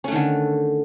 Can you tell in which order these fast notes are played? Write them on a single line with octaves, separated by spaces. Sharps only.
C#4 A3 D#3 D3